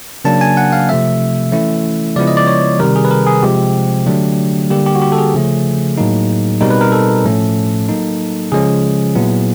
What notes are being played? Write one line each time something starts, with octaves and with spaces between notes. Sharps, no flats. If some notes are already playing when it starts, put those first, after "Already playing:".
C#3 F#3 A#3 D4 A5
G#5
F#5
F5
C3 F3 A3 C4 E5
E3 A3 C#4 E4
C#3 F3 G#3 B3 E4 D5
D#5
D5
C#5
C3 D#3 G3 A#4
G#4
B4
A#4
G#4
C3 F3 G#3 C4 G4
D3 F#3 A3 D4
D3 G3 A#3 G4
G4
F#4
G4
A4
G#4
C#3 F3 A3 C#4
A2 F#3 A#3 D#4
B2 G3 C4 D#4 A#4
B4
A#4
A4
A2 F3 A3 C#4
F#3 A#3 D#4
C#3 F3 G#3 C#4 G#4
A#2 F#3 B3 E4